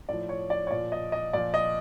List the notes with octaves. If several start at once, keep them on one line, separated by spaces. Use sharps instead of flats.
A2 F3 D5
C#5
D5
C#5
A#2 F3 D5
D#5
D#5
A#2 F3 D5
D#5